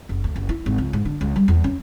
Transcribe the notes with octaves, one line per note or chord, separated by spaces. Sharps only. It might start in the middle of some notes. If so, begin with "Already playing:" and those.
F#1
D2
F#1
E4
G#1
C#2
G#2
D3
C#2
G3
E2
C#4